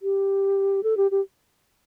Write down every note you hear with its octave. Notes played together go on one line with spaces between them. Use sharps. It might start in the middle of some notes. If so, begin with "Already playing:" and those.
G4
A4
G4
G4